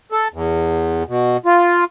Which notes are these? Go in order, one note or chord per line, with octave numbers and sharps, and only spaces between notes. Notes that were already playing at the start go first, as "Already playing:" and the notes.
A4
E2
B2
F4